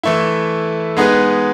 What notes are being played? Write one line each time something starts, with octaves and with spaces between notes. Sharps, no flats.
E3 A3 E4
G#3 B3 D#4 G#4 B4